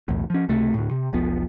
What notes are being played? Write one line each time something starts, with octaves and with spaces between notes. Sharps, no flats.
B1 E2 A2
F3 C#4
C#2 C3 A3
D2 A2
C3
E1 B1 F3 B3